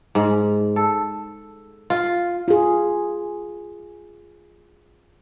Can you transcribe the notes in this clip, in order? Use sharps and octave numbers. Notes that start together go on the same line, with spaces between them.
G#2
A4
F4
F4 G#4